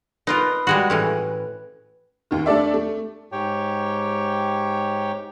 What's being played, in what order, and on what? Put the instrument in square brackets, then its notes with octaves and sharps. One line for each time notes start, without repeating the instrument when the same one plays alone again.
[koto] D#4 F4 A#4 [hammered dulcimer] B4
[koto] G3 G#3 F#4
A2 E3 C#4
[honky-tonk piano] D#2 D#3
A3 D4 A4 D5 E5
A3
[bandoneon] G#2 G4 C#5 G5